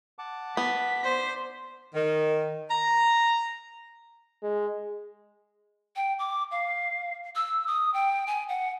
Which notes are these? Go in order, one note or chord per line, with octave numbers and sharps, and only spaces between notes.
F#5 A5 D6
B3 B6
C5 D5
D#3
A#5
G#3
G5
D6
F5
E6
D#6
G5
G#5
F#5